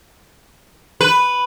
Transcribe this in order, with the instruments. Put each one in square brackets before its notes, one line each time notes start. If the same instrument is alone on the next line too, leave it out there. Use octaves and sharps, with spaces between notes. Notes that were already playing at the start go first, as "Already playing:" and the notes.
[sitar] B4